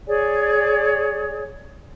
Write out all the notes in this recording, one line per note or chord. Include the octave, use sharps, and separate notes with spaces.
G#4 C#5 D5 G#5